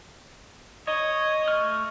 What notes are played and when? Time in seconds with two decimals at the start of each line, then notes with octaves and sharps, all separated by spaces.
0.87 C#5 D#5
1.48 A3 C#6 F6